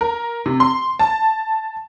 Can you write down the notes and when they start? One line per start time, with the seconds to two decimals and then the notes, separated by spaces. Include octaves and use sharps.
0.01 A#4
0.46 C3
0.60 C6
0.99 A5